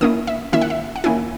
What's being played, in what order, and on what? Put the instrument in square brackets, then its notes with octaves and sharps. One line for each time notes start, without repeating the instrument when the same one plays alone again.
[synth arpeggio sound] D#3 A#3 C#4 E4 D#6
E5
D#3 A#3 C#4 E4 E5
F#5
E5
F#5
D#3 A#3 C#4 E4 G#5